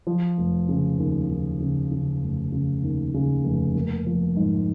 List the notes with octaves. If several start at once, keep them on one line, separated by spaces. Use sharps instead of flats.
F3
F1
C#3
D#2
D#2
C#3
C#3
F1
C#3
D#2
C#3
F1
A#3
F3
G#2